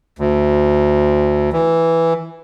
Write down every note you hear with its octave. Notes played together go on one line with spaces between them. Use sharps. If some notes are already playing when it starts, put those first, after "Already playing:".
D2
E3